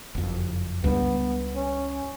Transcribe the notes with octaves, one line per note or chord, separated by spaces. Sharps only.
F#1 F2
C#2 G2 G3 B3
C#4